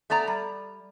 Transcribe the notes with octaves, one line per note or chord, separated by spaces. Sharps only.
A3 B3 D5 A#5
G3